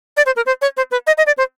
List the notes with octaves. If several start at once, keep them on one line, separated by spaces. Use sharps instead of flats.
D5
C5
A#4
C5
C#5
C5
B4
D#5
D#5
D5
C5